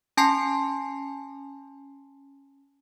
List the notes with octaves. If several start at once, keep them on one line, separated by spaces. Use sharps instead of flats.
C#4 G#5 A5 C6 C7